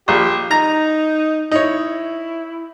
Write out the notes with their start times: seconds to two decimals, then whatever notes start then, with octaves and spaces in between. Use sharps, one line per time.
0.08 A#1 G4
0.51 D#4 A#5
1.51 D#4 E4 C#5